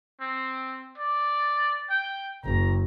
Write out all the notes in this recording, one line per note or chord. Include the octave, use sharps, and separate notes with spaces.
C4
D5
G5
F#1 A#5